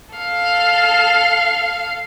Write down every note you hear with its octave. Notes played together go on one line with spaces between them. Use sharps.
A4 F5